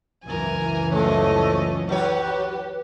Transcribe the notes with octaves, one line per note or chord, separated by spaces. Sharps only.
C#2 F#2 E3 A#4 G#5
F3 A3 C#4 D#5
F#3 G4 B4 C#5